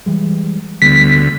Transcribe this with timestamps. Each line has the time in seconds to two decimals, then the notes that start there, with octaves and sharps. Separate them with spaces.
0.06 E3 G3 G#3
0.82 D2 G3 B3 B6